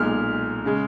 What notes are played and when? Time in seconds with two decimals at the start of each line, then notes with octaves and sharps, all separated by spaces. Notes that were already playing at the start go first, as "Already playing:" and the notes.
Already playing: B1 A#2 G#3 F6
0.65 C#3 G#3